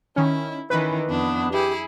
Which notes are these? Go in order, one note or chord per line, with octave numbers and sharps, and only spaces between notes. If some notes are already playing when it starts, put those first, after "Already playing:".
D#3 C#4 E4
D#3 E3 C#4 B4
F2 B3 D4 E4
E4 G4 G#4